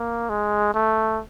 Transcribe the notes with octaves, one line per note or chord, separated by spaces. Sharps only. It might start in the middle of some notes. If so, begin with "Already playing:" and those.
Already playing: A#3
G#3
A3